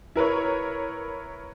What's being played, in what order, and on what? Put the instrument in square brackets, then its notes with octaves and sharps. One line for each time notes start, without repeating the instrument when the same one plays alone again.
[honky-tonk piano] E4 A#4 B4 C#5